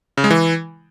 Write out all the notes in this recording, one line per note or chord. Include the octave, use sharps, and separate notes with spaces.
C#3
G#3
E3